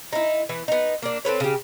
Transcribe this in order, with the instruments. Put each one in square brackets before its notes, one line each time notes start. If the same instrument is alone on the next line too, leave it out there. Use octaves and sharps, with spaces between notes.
[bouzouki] D#4 E4
E3 B3
B3 D#4
A#3 D4
C4 A4 B4 C#5
C#3 G4